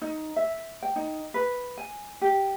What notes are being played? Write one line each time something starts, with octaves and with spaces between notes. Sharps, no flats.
D#4
E5
G5
D#4
B4
G#5
G4